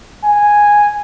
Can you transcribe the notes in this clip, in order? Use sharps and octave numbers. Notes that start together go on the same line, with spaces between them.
G#5